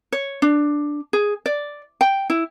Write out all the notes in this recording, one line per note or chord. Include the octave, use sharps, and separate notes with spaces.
C#5
D4
G#4
D5
G5
E4